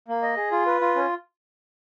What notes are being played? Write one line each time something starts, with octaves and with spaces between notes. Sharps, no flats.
A#3
D#5
G#4
F4
B4
F4
C#4